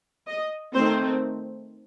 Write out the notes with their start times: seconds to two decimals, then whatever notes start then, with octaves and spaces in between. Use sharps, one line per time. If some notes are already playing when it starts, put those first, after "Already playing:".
0.27 D#5
0.73 D#3 A3 C4 C5